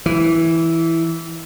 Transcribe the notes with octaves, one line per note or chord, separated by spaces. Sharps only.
E3